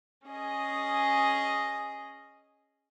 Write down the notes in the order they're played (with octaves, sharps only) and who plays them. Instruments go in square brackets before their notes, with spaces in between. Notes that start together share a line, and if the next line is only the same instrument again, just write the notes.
[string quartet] C#4 G#4 D#5